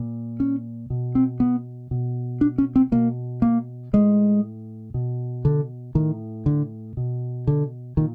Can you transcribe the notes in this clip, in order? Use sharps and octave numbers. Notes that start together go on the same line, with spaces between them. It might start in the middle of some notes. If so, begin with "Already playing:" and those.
Already playing: A#2
C#4
B2
C4
B3
B2
D4
C#4
C4
B2 A#3
A#3
A2 G#3
B2
D3
A2 D#3
D3
B2
D3
A#2 D#3